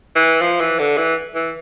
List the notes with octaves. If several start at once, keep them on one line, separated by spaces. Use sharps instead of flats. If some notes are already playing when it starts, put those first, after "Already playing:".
E3
F3
E3
D3
E3
E3